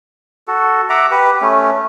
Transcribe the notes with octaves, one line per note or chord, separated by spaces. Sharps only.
F#4 A4
E5 F#5 A#5 D6
G4 B4
A3 C#4